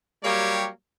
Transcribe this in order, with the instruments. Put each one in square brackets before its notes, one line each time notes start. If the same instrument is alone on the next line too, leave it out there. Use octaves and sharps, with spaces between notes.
[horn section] F#3 G3 A#3 G4 C#5